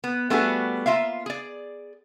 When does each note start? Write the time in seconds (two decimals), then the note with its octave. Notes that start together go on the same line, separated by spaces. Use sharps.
0.04 B3
0.30 G3 A3 B3 D4 F#4 G#4
0.86 A#3 F4 E5 F5
1.26 G#4 D5